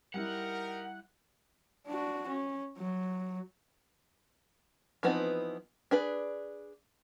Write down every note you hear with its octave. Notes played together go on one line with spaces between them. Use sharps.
G3 D#4 E4 G4 A#4 F#5
D4 F#4
C#4
F#3
E3 F3 B3 C4 D#4
D4 G#4 B4